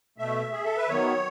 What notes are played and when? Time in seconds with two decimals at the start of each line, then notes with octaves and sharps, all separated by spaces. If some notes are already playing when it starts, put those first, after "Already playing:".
0.18 B2 A3 E5
0.52 G#4
0.65 A4
0.77 B4
0.88 D#3 F#3 B3 C#5